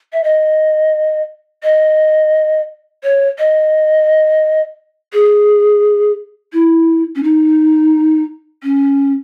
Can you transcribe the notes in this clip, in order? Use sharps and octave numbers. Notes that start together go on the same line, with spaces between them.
E5
D#5
D#5
C#5
D#5
G#4
E4
C#4
D#4
C#4